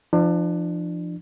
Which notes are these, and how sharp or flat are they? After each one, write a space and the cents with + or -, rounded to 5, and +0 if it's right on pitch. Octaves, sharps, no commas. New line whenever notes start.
F3 -25 D4 +30